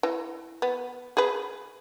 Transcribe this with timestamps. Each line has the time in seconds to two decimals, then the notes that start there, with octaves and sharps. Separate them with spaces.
0.03 E3
0.62 B3
1.17 G#4 B4